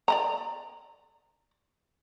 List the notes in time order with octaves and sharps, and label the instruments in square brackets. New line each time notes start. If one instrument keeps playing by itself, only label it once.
[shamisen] D5 D#5 A#5